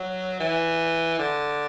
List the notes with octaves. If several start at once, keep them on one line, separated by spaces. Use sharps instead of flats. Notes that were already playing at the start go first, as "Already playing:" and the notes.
Already playing: F#3
E3
D3